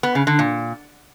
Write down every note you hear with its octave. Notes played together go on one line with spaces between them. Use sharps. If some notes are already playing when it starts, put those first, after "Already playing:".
B3
C#3
D3
A#2